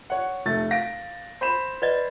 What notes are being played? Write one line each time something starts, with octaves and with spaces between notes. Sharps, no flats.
C#5 F#5
F1 A3 A6
F5 A#6 D7
C5 B5 E7
B4 D5 D#5